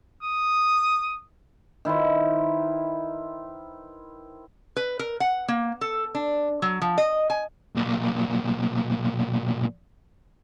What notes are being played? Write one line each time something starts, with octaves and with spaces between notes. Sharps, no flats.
D#6
D#3 E4 B4 C5
B4
A#4
F#5
A#3
A4
D4
F#3
F3
D#5
G#5
B1 A#2